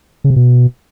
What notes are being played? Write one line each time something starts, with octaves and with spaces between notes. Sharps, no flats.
C#3
C3
B2